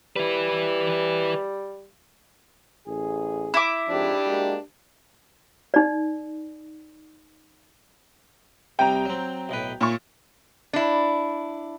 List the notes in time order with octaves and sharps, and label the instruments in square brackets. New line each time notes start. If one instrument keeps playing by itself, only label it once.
[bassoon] G3 [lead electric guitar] E4 B4
[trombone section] A1 G#4
[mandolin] E4 D6
[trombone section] F2 G#2 F3 [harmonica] D4 G4
[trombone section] G#3 A#3 F#4
[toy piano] D#4 D5
[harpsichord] C2 C3 G3 [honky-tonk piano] G5 A#5
[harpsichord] F#3 C4
B1 A2 B4
[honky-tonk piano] A#2 C#6 [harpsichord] C#5
[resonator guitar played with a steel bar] D4 E4